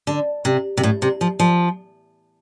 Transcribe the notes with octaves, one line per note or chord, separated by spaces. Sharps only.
D3
C3
C3
A2
C3
F3
F3